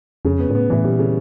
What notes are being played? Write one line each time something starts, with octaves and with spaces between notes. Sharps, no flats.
F2 C#3
B3
G#2
A2 B3
A2 E3
A#2 G3
C#3